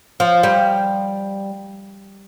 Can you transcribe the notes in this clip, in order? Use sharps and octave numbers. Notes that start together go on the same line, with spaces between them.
F3
G3